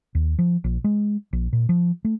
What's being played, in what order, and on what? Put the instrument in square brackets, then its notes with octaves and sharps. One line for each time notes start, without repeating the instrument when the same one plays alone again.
[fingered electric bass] D#2
F3
A#1
G#3
A#1
A#2
F3
A3